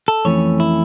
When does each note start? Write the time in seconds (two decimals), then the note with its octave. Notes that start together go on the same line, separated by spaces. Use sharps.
0.08 A4
0.25 F2 E3 A3 C#4 C#5
0.60 E4